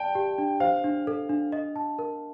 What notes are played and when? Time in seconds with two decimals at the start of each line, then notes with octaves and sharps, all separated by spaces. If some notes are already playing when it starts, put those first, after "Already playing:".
Already playing: D5 G5 A5
0.15 G4
0.38 D4
0.60 C5 F5
0.84 D4
1.07 A4
1.29 D4
1.52 D#5
1.76 A5
1.99 A#4